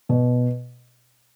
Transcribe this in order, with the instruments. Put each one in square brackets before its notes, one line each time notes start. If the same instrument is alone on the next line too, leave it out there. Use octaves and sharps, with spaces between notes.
[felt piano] B2